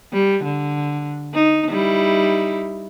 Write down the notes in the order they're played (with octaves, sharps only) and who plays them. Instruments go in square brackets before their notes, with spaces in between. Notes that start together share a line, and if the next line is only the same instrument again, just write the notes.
[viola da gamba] G3
D3
D#4
G3 D#4 E4